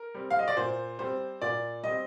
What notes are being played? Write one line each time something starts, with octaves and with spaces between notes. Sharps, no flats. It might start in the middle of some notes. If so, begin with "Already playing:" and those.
Already playing: A#4
G3 C4
F5
D#5
D5
A#2 C5
G3 C4 C5
A#2 D5
G3 C4 D#5